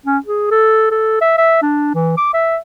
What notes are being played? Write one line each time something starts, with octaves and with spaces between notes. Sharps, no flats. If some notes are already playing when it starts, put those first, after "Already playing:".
C#4
G#4
A4
A4
E5
E5
D4
E3
D6
E5